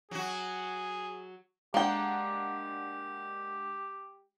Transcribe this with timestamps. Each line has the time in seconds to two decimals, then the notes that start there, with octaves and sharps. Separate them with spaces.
0.11 F#3 F#4 G#4
1.74 G#3 A#3 D4 G4 F#5 G5